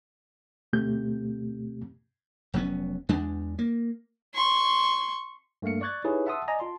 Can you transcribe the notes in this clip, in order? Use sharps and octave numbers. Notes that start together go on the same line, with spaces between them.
D2 B2 A3 C4 G4 G6
F1 F#3 B3 C#4
E2 G#3 D4
A#3
C6 C#6
G2 A3 A#3 F5 C#7
D5 C#6 F#6 G#6 A6
D#4 E4 G4 G#4 B4 C#5
E5 F#5 A5 C6 D#6 E6
D5 D#5 G#5 A#5
F4 A5 C6